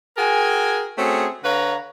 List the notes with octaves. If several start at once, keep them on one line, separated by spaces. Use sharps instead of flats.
F#4 G#4 A#4 G5 G#5
A3 C4 C#4 F#4 G#4
D3 B4 C#5 F5 A#5